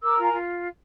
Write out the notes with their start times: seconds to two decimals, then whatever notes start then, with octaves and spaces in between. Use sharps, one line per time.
0.01 A#4 D6 E6
0.17 F4 G#5 A#5
0.32 F4